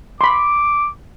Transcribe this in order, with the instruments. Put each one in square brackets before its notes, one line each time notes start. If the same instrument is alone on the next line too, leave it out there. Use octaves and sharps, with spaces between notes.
[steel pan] B5 C6 [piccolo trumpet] D6